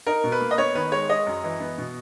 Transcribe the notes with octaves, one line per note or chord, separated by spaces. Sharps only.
D#4 A#4
B2
B4
A#3
D#5
B3 C#5
D#3 B4
G#3 C#5
G#3 D#5
F#2
E3
B3
B2